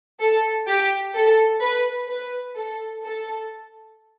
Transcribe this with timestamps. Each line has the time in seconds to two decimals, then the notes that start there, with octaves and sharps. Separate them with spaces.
0.20 A4
0.67 G4
1.15 A4
1.61 B4
2.08 B4
2.55 A4
3.03 A4